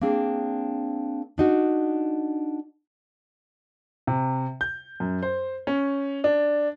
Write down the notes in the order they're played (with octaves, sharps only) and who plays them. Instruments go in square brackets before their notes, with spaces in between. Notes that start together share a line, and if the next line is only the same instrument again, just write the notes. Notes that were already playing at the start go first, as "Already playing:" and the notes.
[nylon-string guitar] A#3 C4 D4 G#4
D4 D#4 F#4
[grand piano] C3
G6
F#2
C5
C#4
D4